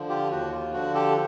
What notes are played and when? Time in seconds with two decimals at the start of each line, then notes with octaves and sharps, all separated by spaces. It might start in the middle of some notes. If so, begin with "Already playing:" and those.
Already playing: D3 F3
0.09 F4 G4
0.30 D#2 F#4
0.52 F4
0.73 D3 F3 F#4
0.94 G4 A4